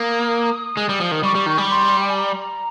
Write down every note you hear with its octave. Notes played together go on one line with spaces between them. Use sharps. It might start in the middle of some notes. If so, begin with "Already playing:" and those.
Already playing: A#3 D#6
G#3
G3
F3
D#3
D#6
G3 C#6
G3
D#3
G3
C6
G5
G#5
A#5